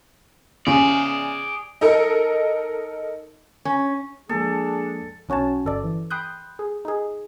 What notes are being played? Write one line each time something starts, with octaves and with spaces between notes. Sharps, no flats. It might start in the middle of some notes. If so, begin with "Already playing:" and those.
C#3 C#4 G#4 D5
D#4 A4 A#4
C#4
F3 G#3 A#3 D4 G#4 A4
B1 C#4 F#4 C#5 A5
G1 A4 D5
E3
G5 B5 C6 D#6 F#6 G6
G#4
D#4 G#4